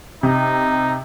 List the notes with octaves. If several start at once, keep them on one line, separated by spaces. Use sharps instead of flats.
C3 D#4